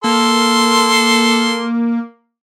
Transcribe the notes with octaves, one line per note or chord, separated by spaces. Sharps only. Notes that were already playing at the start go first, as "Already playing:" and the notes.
A#3 A4 C6